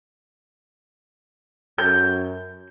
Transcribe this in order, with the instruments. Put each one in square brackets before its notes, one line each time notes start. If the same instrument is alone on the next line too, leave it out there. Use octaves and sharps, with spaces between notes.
[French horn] F#2 [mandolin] G6